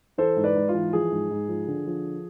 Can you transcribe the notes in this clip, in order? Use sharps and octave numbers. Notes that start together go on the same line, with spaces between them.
E3 A4 C5
G#2
B4 D5
G#2
F4
E3
F3 G#4
G#2
G#2
F3
D3
F3